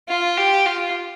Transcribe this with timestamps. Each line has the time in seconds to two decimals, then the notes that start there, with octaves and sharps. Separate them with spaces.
0.09 F4
0.38 G4
0.66 F4